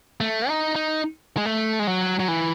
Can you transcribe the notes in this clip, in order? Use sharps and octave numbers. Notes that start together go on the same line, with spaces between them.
A3
D#4
D#4
G#3
A3
G#3
F#3
F#3
E3